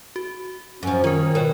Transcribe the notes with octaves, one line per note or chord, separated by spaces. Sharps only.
F#4
F#2 F3 C#4
D#3 C#4 F4 A#4
B2 A#4 C#5 G5